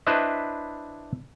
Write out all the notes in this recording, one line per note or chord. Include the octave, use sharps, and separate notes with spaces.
D4 E4 B4 C5 D#5 E5